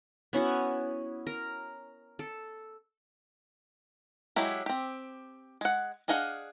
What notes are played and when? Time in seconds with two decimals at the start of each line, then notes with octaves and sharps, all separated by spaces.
0.33 B3 C#4 E4 F#4
1.27 A#4
2.19 A4
4.36 F#3 G#3 E4 G4
4.66 C4 G4
5.61 G#3 F#5
6.08 D4 G#4 D#5 F5 F#5